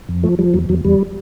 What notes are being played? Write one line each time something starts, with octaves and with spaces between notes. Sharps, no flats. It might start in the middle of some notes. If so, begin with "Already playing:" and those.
F2
F3 A3
F3 G3
E2 F#3
E2 F#3
E2 G3